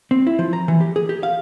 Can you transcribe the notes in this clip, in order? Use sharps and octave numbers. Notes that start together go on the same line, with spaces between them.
C4
E4
F3
A#5
E3
G4
G#4
G4
F5